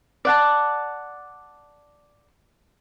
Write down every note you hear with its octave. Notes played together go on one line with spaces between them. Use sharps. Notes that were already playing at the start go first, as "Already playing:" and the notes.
D5 F#5 A5